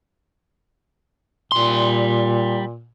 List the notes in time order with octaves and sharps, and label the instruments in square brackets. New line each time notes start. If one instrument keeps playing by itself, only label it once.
[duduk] A#2 [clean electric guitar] G3 C6